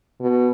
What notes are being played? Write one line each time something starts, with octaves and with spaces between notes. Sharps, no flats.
B2